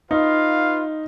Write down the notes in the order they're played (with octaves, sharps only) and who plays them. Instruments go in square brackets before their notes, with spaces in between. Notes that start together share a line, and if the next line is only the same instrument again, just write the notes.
[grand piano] D#4 [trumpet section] F4 B4 F5